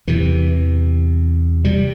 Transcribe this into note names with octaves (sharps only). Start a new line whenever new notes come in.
E2 C3 E3
C3 G3